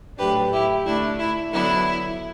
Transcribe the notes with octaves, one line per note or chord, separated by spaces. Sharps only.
A2 F#3 A3 D4 G4 B4
E4 G4
D3 A3 D4 E4
E4
D3 F#3 B3 D4 E4